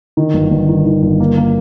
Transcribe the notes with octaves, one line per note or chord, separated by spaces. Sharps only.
D#3
G1
G1
D#3
D#3
G1
A#3
A#3